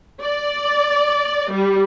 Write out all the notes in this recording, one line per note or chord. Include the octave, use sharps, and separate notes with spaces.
D5
G3